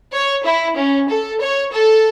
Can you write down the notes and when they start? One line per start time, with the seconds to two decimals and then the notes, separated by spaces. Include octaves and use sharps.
0.12 C#5
0.44 E4
0.76 C#4
1.09 A4
1.40 C#5
1.72 A4